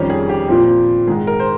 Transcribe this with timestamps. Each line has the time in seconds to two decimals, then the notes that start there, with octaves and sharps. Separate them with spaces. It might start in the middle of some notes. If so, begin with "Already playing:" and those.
Already playing: F2 D#3 G3 C#4
0.10 G#4
0.29 G4
0.48 A#2 F3 C4
1.07 G#2 D#3 G#3 G#4
1.27 A#4
1.40 C5